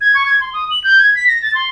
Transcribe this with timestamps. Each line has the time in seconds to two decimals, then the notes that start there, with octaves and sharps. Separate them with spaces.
0.01 G#6
0.15 C#6
0.26 G#6
0.41 C6
0.54 D#6
0.71 F#7
0.84 G6
0.99 G#6
1.15 B6
1.28 A#6
1.42 A6
1.55 C6